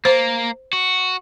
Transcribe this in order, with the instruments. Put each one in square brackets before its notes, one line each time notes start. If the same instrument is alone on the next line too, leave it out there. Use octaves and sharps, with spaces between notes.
[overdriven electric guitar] A#3 [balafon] C5
[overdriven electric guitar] F#4